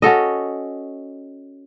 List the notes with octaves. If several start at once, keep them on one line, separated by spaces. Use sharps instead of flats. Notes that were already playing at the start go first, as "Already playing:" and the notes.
C#4 F#4 A4 D#5